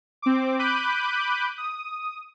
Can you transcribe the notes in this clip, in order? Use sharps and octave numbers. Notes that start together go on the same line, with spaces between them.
C4 D6
B5 D6 F#6 G6 D#7
D#6